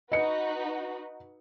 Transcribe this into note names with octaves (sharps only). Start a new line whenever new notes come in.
D#4 F#4 B4 D#5 C#7